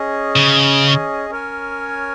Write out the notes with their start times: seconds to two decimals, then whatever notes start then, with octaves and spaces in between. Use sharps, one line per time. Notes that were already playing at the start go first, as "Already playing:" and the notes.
Already playing: C#4 G#4 D#5
0.36 C#3
1.30 C#4 A#4 C#5 G#5